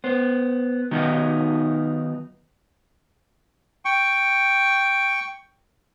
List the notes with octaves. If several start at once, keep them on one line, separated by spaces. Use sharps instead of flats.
B3 C5
D#3 F#3 B3 D#4 F4 F#4
G5 C#6